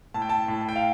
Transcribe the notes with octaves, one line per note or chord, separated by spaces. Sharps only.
A2 A5
G5
A5
A2
A5
G5
F5